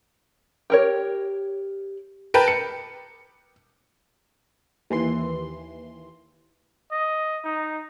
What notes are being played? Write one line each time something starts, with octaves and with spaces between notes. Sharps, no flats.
G4 A#4 C#5
A#4 B4 G5 A5
C#7
D#2 E3 C6
D#5
D#4